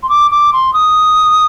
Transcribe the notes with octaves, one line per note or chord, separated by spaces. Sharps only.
C6
D6
D6
C6
D#6